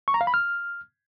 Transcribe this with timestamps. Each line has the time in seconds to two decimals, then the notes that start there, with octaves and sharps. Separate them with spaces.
0.08 C#6
0.14 A#5
0.21 F5
0.27 B5
0.34 F6